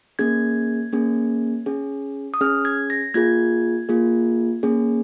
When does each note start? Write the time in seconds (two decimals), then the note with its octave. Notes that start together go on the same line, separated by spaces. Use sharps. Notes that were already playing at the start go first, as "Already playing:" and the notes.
0.19 A#3 C#4 G#4 G#6
0.93 A#3 C#4 G#4
1.66 C#4 G#4
2.34 D#6
2.41 C#4 G#4 F6
2.65 G#6
2.90 A#6
3.14 A#3 F4 G#4 G#6
3.89 A#3 F4 G#4
4.63 A#3 C#4 G#4